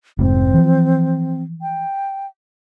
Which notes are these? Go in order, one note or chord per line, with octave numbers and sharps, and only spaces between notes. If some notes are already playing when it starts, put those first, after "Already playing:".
F1 G#2 C4
E3 F3
G5